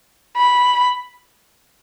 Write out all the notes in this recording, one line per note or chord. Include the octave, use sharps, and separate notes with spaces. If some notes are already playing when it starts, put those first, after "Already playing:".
B5